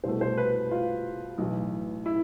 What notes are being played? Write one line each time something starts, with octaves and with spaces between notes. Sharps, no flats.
C2 B2 A3 C5
C5
B4
F4
B1 A2 E3
E4